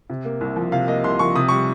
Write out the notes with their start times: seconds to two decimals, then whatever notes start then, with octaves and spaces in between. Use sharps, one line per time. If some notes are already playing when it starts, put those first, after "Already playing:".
0.10 C3
0.25 A#3
0.41 C2
0.56 F3
0.72 C3 F5
0.88 A#3 D#5
1.04 C2 C6
1.19 F3 C#6
1.36 C3 D#6
1.49 G3 C#6